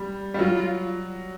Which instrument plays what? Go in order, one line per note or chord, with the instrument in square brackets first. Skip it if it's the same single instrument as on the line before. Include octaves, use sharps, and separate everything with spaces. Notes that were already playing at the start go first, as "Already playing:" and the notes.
Already playing: [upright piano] G3
G3
[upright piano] F#3 [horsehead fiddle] F4